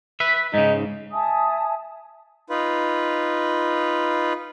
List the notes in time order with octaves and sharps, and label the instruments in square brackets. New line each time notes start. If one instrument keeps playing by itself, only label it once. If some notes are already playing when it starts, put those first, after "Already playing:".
[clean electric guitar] B4 E5
[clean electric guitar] G#2 C#3 [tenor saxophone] D#4
[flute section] E5 G#5 A5 D#6
[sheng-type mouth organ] D#4 F4 B4